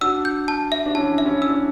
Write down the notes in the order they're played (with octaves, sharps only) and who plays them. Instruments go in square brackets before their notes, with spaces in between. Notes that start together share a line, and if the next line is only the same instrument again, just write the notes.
[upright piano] D4 F#4 [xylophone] E6
[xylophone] G6
A5
E5
[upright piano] D4
[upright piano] C#4 E4 [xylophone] A5
[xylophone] E5
[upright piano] C#4 E4
[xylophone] E6
[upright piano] D4